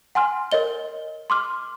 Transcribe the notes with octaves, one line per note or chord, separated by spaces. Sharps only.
F#5 G#5 C6 F6
A#4 C#5 D#5 G7
C6 D6 F6